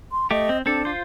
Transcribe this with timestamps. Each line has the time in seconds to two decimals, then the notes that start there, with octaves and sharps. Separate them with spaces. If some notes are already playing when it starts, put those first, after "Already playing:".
0.12 C6
0.31 A3 G4 D#5
0.49 C4
0.66 C4 D4 A4
0.85 F4 C5